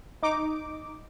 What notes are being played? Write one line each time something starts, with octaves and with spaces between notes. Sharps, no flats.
D#4 D6